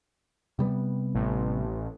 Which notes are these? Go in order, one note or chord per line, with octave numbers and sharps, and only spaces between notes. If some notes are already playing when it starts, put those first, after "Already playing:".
C3 G3 B3
A1